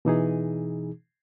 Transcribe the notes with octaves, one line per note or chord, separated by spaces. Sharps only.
B2 E3 D#4 G#4